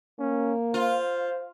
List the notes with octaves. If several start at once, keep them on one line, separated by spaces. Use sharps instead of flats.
A#3 C#4
F4 C5